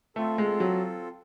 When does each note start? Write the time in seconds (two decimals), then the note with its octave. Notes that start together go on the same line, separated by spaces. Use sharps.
0.16 A3 C4 F4 A4
0.38 G#3
0.60 F#3